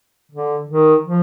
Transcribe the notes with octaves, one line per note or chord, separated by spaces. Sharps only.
D3
D#3
F3